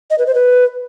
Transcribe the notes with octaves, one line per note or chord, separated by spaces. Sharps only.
D#5
B4
C5
B4